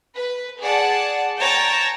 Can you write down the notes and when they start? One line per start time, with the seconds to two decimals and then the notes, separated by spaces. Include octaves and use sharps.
0.15 B4
0.61 G#4 D5 F#5 A5
1.39 C#5 G5 A5 A#5 A6